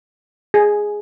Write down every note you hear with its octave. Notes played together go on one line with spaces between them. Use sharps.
G#4